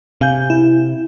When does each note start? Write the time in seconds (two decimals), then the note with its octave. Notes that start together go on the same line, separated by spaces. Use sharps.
0.21 C3 F5 G#5 G6
0.50 E4